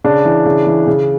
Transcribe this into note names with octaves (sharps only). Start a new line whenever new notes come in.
C#3 D4
E3
C#3
E3
C#3